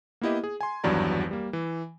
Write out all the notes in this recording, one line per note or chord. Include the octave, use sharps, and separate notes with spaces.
A#3 B3 E4 G4 D#5
G#4
G#5 C6
G#1 E2 G2 F#3 D5 A#5
G3 A#3
E3